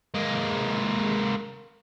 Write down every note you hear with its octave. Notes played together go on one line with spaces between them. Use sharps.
G#3 A#3